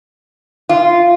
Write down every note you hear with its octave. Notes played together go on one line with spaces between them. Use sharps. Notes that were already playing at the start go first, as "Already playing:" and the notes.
F4